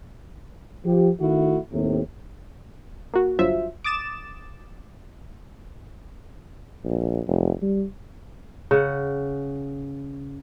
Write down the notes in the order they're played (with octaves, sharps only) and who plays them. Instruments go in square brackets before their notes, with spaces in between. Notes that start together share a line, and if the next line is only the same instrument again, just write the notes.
[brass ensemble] F3 G4
D#3 A3 E4 F#4
D#2 A2 C3
[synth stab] A#3 F#4
G1 G2 F#3 F4 C5 E5
D6 D#6 A6 E7
[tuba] A#1
F1
G3
[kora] C#3 F#5